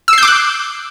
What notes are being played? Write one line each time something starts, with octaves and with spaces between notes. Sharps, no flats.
D6 E6 F#6 G6 C7